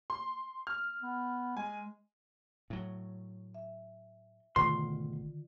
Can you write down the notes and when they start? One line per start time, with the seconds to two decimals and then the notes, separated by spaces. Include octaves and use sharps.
0.10 C6
0.67 F6
1.02 B3
1.57 G#3 G#5
2.70 A2 F#3
3.54 E5
4.56 G#1 B2 D3 D#3 A3 F4 C6